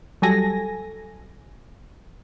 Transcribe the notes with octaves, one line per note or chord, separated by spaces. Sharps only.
F#3 G3 A4 G#5 A#6